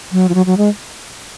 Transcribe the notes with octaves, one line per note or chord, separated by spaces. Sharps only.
F#3
F3
F#3
F#3
G#3